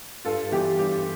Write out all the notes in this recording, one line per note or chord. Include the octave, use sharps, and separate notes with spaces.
G2 F4 A4
E3 G3 B3 G4
G2 G4